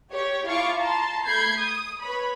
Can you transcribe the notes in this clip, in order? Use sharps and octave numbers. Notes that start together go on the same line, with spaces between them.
G4 C#5
E4 F4 F5 A5 C#6 D6
A5 A#5 C6
A3 B5 G6 G#6 C7
D#6
B4 C#5 B5